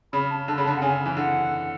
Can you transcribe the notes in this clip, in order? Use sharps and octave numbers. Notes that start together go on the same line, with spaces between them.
C#3 B5
A5
D3 A5
C#3 B5
D3 A5
F#5
C#3 G#5
E3
D3 F#5